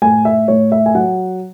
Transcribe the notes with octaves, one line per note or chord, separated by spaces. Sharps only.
A2 G#5
E5
A2 C#5
E5
G#5
F#3 F#5